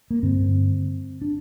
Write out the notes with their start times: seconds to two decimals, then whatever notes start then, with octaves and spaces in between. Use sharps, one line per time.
0.11 A#3
0.23 G2 D3 C4
1.22 D4